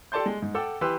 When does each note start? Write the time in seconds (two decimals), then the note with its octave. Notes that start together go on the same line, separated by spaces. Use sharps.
0.12 G4 A4 D5 A5 C6 G6
0.26 G#3
0.42 G#2
0.55 A4 F#5 G5 D6 E6
0.81 E3 G4 B4 C6 E6